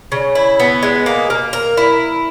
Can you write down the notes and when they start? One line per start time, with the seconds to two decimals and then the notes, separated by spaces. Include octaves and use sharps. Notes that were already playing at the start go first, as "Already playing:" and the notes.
0.12 C#3
0.35 E4
0.60 B3
0.83 G#3
1.06 A#3
1.30 A#3
1.53 A#4
1.77 E4